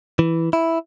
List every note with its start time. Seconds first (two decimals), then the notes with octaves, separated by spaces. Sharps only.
0.19 E3
0.53 E4